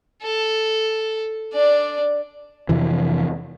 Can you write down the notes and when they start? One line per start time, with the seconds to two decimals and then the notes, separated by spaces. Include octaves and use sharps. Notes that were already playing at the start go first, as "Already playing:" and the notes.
0.23 A4
1.53 D4 D5
2.69 F2 C3 E3